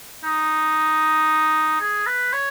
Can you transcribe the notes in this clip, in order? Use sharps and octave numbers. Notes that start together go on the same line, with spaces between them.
D#4
G#4
B4
C#5